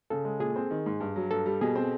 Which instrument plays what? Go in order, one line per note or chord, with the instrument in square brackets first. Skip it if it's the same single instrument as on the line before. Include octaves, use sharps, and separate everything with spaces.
[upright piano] C#3 [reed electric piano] A4
[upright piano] G#3
[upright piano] A#2 [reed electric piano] G#4
[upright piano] C4
D#3
G#2
G2
F#3
[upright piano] G2 [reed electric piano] A4
[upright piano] G3
[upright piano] B2 [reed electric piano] G#4
[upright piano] C4